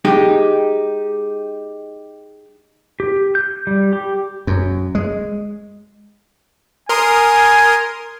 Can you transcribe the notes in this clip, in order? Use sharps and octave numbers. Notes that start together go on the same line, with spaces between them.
G#3 D#4 G4
G4
G6
G3
G4
F#2
G#3
A#4 G#5 C6 D#6